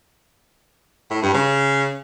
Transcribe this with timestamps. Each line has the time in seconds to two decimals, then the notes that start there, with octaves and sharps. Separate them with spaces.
1.11 A2
1.23 G2
1.34 C#3